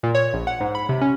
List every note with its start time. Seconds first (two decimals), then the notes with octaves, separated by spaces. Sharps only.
0.03 A#2
0.15 C#5
0.33 A#1
0.47 F#5
0.60 G#2
0.75 B5
0.89 C3
1.01 C#4